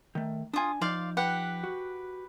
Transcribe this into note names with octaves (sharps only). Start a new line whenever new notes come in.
D#3 A3
D4 F4 G#5 D#6
F3 D#4 D5 F5 C6
G4 B4 F#5
F#4